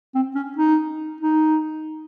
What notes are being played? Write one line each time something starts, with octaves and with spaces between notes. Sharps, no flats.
C4
C#4
D#4
D#4